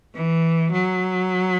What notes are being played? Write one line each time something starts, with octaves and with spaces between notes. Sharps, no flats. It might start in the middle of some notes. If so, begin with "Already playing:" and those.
E3
F#3